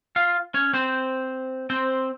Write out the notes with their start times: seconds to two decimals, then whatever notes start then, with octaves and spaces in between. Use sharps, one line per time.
0.16 F4 F5
0.54 C#4 C#5
0.74 C4 C5
1.70 C4 C5